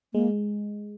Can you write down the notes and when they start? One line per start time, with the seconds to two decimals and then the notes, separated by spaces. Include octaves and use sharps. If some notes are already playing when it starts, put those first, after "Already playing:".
0.14 G#3 A#3